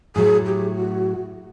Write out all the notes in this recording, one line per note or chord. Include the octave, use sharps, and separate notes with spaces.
A2 F#3 A3 G#4
G4
F#4